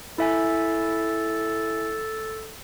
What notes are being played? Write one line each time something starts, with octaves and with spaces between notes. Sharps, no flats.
E4 A4 E5 G#5